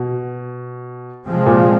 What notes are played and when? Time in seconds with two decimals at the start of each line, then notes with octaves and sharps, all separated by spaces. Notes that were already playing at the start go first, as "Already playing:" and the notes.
Already playing: B2
1.26 C3 F3 G#3 C4
1.46 A#2